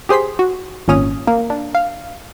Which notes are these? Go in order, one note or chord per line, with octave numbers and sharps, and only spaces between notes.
G4 G#4 C5 C6 B6
F#4
G#1 A#2 C#4 D#6 F6
A#3
D4
F5